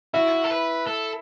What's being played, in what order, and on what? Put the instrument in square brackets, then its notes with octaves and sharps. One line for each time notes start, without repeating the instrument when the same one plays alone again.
[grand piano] E4 [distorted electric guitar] F#4
[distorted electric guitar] A4
B4
A4